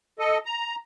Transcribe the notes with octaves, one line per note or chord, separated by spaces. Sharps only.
A4 D#5
A#5